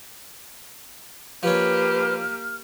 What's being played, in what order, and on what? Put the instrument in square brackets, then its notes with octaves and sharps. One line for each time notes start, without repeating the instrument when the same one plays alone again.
[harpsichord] F3 C#4 [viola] A#3 G4 [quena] B4 [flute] F6